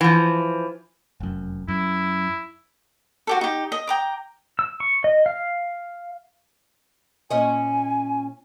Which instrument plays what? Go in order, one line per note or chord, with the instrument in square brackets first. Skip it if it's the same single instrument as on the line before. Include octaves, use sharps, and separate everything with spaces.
[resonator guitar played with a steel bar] E3 F3
[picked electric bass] F1 F#2
[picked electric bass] F#2 [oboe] E4
[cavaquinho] F#4 G4 A4
D#4 G4
D#5
G5 A#5 D6
[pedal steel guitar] E6
C#6
D#5
F5
[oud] A#2 C#4 D#5 [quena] G#5